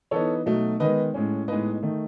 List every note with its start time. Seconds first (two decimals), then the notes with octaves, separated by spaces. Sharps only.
0.11 E3 B3 D#4 A4 C#5
0.46 B2 F#3 A3 D#4
0.80 D#3 G#3 B3 B4 D#5
1.14 A2 G#3 C#4
1.48 A2 G#3 B3 D#4 B4 D#5
1.83 D#3 A3 D#4